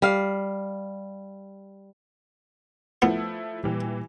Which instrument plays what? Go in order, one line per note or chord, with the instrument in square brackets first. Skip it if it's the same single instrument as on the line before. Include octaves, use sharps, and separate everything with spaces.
[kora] G3 F5
[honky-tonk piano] F3 A3 E4 [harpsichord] B3
[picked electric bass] A#2 G3 [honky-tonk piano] E3 G4